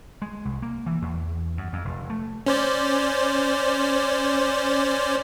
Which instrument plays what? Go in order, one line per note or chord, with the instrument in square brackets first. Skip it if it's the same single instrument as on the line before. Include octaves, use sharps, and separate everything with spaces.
[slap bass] G#3
C2
A#3
E3
E2
F#2
F2
F1
A3
[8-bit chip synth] C#4 C5 D5